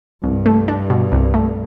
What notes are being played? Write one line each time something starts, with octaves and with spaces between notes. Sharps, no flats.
C2 G2
A3
D4
B2
C2
A3